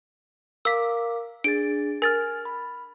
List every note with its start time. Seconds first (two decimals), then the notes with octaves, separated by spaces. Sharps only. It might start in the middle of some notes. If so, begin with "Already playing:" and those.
0.65 A#4 F5 D6 E6 B6
1.44 D4 G#4 A6 D7
2.02 A#4 G#5 F6 A6
2.45 B5